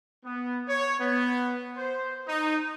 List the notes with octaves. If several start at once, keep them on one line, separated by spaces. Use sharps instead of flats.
B3
C#5
B3
C5
D#4